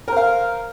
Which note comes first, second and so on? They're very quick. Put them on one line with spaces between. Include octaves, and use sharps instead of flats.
A#4 C5 F5